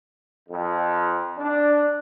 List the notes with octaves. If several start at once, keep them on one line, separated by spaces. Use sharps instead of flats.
F2
D4